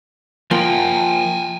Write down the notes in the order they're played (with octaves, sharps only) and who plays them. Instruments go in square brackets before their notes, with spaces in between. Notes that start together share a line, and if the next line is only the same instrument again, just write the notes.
[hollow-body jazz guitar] F3 A#3 [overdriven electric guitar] G5 G#5